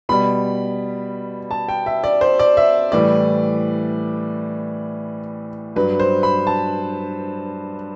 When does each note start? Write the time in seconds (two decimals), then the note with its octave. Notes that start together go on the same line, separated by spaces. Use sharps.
0.09 B2 G3 B5
1.51 A5
1.68 G5
1.86 E5
2.04 D5
2.21 C5
2.39 D5
2.57 E5
2.92 A2 E3 G3 D5
5.76 G2 F#3 B4
6.00 C5
6.23 B5
6.47 A5